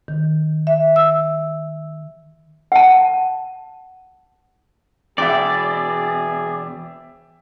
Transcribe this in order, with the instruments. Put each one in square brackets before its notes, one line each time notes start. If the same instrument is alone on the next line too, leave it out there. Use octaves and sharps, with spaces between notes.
[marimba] D#3
E5
E6
[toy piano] F#5 A5
[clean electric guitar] E2 B2 [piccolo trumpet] G#4 [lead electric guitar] D5 [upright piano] E5 G5